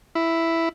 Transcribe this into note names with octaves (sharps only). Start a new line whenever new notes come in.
E4